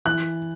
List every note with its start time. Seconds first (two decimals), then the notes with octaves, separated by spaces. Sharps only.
0.05 E3 F#6